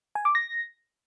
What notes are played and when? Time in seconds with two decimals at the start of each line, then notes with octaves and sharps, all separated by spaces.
0.15 G#5
0.25 D6
0.35 A#6